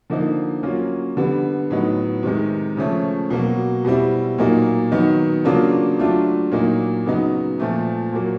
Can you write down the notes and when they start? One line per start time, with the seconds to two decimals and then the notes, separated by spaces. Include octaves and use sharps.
0.10 D3 F3 A#3 D#4
0.63 F#3 A#3 C#4 F4
1.17 D3 G3 B3
1.70 A2 F#3 B3 D#4
2.23 C3 D#3 G#3
2.77 C#3 F3 A3 C#4
3.30 B2 F#3 A#3
3.85 B2 G3 C4 E4
4.38 A#2 F#3 A#3 D#4
4.91 D#3 F#3 B3 D#4
5.45 C#3 F#3 A#3 D4 F4
5.99 F#3 A3 D4 F4
6.52 A#2 F#3 A#3 D#4
7.06 C#3 F#3 B3 D#4
7.59 A#2 F3 A3
8.12 A#2 F#3 A#3